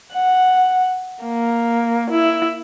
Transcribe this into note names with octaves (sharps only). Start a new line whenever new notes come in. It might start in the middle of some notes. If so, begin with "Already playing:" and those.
F#5
A#3
E4